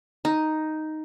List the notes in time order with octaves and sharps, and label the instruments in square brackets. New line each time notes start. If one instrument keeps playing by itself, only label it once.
[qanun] D#4